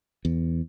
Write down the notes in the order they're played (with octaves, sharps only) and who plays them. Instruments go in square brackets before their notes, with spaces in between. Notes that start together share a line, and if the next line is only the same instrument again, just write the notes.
[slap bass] E2